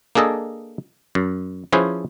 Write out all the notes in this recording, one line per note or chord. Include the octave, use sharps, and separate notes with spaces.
A#3 D4 G#4 A4 D#5
F#2
F3 C#4 E4 G#4 B4 C5